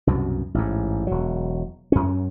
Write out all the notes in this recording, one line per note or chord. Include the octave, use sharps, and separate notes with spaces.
C2 F#2 B2
A1 G#2
E1 F#3
F#2 C#4